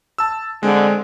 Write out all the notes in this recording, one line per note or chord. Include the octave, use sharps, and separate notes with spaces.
A5 E6
D3 G#3 C4